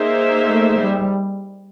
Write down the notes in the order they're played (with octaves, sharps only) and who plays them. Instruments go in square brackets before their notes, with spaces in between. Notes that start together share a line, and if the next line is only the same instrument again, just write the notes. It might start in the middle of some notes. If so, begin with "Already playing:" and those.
Already playing: [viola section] A#3 D#4 G#4 C5 E5
[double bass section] A3
G3